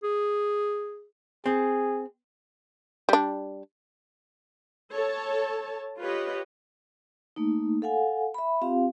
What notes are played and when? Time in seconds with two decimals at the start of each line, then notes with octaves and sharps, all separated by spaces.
0.04 G#4
1.46 C4 G#4
3.09 G3 D4
4.95 A4 C#5 A5
6.02 F4 G4 B4 C#5 D#5
7.36 A3 A#3 D#4
7.82 A4 F5 F#5 G#5
8.34 E5 B5
8.62 C4 F4 G4 F5